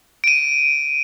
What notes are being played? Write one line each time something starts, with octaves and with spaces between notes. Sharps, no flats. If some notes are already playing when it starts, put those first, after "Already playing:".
D7 D#7